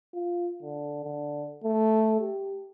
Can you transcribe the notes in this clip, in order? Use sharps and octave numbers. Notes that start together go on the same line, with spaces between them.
F4
D3
D3
A3
G4